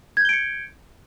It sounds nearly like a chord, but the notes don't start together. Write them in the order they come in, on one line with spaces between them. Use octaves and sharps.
G#6 G6 G7 D7 C#7